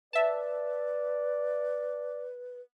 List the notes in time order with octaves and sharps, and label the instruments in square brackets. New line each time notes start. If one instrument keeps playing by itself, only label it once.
[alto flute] B4 [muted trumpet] D5 [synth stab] E5 A5